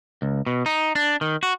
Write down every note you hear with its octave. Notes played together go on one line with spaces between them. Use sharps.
C#2
B2
D#4
D4
D#3
F#4